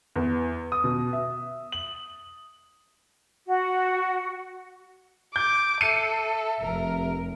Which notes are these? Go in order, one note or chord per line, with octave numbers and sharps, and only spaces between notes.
E2
D#6
B2
E5
F#7
F#4
D6 G6
A4 E5 C7 C#7 D#7
F1 A#4